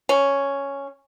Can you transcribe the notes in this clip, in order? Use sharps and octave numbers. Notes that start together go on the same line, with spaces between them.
C#4